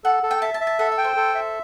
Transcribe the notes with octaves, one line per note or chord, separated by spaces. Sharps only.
A4 F#5
A4
G5
E5 A5
A5
E5
A5
A4 F#5
E5
G5
C5
A4
E5